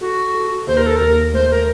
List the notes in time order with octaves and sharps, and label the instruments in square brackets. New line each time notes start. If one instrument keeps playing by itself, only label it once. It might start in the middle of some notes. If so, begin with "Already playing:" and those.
[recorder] F#4 [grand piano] A4
[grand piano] A4
[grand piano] D#2 [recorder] C5
[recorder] A#4
A4
[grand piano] D#2 [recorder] A#4
[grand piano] A3 [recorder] C5
[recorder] A#4